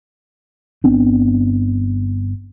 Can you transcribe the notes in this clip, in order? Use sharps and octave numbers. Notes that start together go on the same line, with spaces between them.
G1 B3 C4 D4